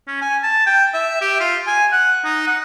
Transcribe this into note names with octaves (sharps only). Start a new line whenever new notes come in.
C#4
G#5
A5
G5
E5
G4
F4
G#5
F#5
D#4
F#5